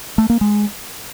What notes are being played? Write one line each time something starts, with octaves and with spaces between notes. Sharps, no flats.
A3
A#3
G#3